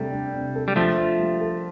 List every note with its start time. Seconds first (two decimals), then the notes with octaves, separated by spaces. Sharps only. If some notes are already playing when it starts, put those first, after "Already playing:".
Already playing: C3 G3 A3 D4 A4
0.12 D4
0.34 C3
0.55 A4
0.68 G3
0.76 F3 A3 D4
0.98 F4
1.19 G3
1.41 A4